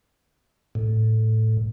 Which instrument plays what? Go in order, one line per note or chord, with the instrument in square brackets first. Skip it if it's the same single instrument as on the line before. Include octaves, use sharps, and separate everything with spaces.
[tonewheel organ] A2